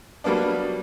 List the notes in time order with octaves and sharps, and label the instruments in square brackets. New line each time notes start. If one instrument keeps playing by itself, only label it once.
[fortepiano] F#3 G3 A#3 B3 D4